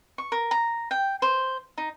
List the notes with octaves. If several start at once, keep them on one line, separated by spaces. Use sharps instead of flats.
C#6
A#4
A#5
G5
C5
D#4